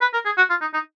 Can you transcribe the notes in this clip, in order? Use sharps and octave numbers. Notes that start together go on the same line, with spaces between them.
B4
A#4
G#4
F#4
F4
D#4
D#4